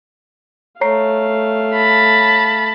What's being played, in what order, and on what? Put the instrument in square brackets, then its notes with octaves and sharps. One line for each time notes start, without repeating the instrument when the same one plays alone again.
[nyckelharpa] A3 F5 [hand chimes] C#5 A#5 C7
[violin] A5 B5